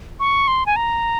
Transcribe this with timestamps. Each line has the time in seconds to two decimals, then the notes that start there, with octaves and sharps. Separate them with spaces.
0.20 C#6
0.48 C6
0.66 G#5
0.76 A#5